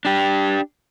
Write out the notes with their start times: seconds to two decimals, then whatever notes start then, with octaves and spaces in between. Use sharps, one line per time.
0.05 D4 G4